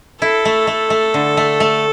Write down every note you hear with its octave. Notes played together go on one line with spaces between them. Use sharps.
E4 A4
A3
A3
A3
D3
A3
A3